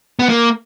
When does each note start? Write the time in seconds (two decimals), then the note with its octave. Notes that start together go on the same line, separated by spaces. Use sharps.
0.19 B3
0.29 A#3